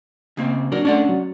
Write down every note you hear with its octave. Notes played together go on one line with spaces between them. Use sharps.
C#3 A#3 C4
F#3 D4 F#4 A#4
A3 C#4 D4 D5 F#5
F#3